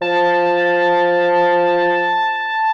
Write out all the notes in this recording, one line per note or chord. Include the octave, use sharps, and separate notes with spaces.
F3 A5